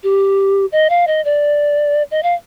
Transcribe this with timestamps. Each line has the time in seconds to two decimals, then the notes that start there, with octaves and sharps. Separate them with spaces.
0.03 G4
0.72 D#5
0.90 F5
1.07 D#5
1.25 D5
2.11 D#5
2.23 F5